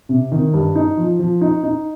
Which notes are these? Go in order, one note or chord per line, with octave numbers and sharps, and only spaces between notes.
C3
D#3
G2
D#4
F3
F3
D#4
D#4